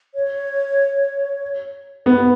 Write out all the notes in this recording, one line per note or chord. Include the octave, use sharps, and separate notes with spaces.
C#5
B3 B4